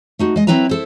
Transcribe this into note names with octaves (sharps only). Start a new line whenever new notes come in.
A3 D#4 F#4
G#3 D#5
F#3 C4 E4 B4 E5 A#5
E4 A4 C5